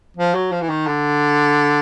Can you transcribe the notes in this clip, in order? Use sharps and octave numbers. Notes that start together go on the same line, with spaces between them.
F3
F#3
F3
E3
D#3
D3